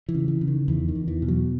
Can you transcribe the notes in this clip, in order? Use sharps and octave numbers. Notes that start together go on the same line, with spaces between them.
E3
C#3
E3
C#3
D#3
E2 E3
D#3
E2
E3
B2
F#3